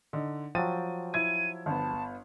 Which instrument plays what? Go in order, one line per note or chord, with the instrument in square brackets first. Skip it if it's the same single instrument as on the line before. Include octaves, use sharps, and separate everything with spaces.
[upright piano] D3 D#4
[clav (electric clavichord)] F3 F#3 [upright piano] G5 A6 D#7
[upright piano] E4 G#6 [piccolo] D#7
[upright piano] G1 B3 [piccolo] A5